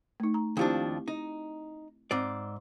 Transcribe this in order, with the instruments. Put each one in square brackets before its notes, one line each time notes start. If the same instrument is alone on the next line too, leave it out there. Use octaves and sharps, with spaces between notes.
[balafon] A3 D#4
A#5
[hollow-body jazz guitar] D#2 F3 D4 [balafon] C4 E4 G4
[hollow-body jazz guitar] D#4
G#2 C4 D5